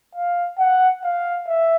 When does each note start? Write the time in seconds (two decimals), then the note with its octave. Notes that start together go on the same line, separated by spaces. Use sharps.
0.15 F5
0.58 F#5
1.03 F5
1.47 E5